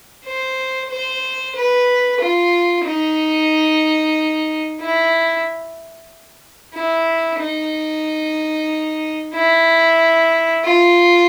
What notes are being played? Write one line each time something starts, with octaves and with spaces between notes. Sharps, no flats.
C5
C5
B4
F4
D#4
E4
E4
D#4
E4
F4